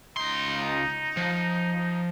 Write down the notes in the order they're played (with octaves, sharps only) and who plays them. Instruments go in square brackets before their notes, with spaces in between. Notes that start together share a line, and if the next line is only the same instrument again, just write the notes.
[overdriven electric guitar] C#2 C6 [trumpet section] D#4
[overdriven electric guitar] F3